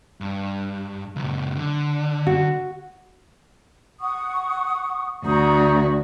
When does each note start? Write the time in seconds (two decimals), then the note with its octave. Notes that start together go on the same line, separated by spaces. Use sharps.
0.21 G2
1.16 C#2 F#2
1.57 D3
2.27 F#4
4.01 F#5 C#6 D#6
5.25 D2 F#4 A#5 D#6 G6